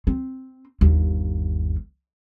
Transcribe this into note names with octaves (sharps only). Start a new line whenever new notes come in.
C4
G1 D#2